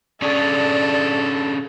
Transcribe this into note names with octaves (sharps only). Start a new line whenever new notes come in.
C#4 D4 G#4 A4 D5